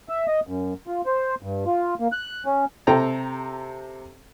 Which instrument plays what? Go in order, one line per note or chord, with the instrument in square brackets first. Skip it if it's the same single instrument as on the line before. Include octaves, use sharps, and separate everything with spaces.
[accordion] E5
D#5
F#2
F4
C5
G2
F4
A#3
F#6
C#4
[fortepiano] C3 A4 G5 A#5